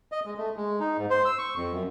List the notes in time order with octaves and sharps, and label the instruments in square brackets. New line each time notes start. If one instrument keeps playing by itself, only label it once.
[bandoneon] D#5
G#3
A3
G#3
D#4
G#2
C5
E6
C#6
F2
F#2